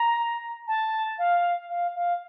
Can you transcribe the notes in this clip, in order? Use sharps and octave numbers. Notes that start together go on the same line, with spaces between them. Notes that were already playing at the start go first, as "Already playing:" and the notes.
Already playing: A#5
A5
F5
F5
F5